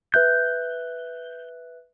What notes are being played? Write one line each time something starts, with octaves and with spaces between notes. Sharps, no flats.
B4 E5 F#6 G6